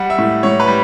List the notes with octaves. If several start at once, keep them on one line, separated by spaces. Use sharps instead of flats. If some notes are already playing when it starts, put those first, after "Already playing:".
Already playing: G3 F#5
E5
A2
A2 C#5
B4
G3